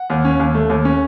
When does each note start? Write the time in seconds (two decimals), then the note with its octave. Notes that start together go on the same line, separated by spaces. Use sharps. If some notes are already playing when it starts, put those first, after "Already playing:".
Already playing: F#5
0.10 D#2
0.25 C#4
0.40 D#2
0.55 A3
0.70 D#2
0.85 C#4